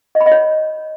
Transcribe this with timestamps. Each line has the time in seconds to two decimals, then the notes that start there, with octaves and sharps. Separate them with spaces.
0.15 D#5
0.21 B5
0.26 D#5
0.32 C#5